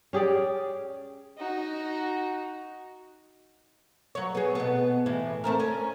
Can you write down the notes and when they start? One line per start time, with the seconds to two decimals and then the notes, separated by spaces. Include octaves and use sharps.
0.13 C#4 G4 G#4 D5
1.38 D#4 F#4
4.15 F#3 C#5
4.35 B3 G#4
4.55 B2 B3
5.06 A2 E3
5.44 A3 C4 A#4
5.60 C#4